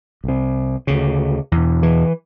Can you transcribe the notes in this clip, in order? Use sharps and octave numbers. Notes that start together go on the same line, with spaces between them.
C2 C3
D2 C#3
E2 B2
E3